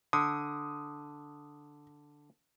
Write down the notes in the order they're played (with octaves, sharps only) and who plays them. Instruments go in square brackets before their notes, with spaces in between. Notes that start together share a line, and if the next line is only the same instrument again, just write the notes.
[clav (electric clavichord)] D3 [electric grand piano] D#6